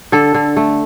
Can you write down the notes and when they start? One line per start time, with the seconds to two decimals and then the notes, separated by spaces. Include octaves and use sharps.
0.12 D3 A4
0.34 D3
0.57 A3